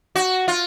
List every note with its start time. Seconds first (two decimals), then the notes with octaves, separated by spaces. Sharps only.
0.16 F#4
0.48 F4